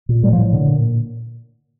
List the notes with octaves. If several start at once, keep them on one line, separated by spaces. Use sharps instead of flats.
A#2
A2 G3
F3
A2
A#2 D3
A#2